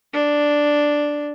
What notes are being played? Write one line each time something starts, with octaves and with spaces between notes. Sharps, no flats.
D4